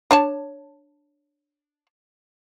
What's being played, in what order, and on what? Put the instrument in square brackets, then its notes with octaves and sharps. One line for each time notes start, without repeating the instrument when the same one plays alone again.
[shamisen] D4 C#5 A5